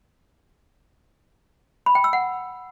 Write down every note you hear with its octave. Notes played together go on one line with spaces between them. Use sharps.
B5
G5
E6
F#5